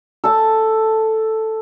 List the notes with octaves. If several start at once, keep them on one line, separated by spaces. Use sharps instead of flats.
A4 A5